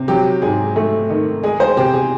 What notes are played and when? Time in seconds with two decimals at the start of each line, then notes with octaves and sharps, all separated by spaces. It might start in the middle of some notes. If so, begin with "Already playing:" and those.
Already playing: C3
0.08 F#3 G4
0.42 G#2 G#4
0.76 A3
1.10 D#3
1.43 G#3 G#4
1.60 C5
1.77 C3 G4
1.93 G#4